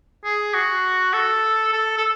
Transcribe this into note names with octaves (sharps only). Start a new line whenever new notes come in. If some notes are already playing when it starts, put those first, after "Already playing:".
G#4
F#4
A4
A4
A4